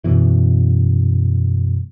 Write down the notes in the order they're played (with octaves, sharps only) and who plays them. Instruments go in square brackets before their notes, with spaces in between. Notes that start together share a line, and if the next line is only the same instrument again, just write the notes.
[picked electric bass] F#2 B2 E3